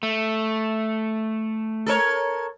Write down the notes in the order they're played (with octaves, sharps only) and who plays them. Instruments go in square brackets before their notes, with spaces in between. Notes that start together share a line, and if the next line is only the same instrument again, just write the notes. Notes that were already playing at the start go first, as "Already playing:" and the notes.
[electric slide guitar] A3
[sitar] A4 A#4 C#5